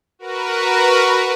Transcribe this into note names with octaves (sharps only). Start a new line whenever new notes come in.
F#4 A#4 B4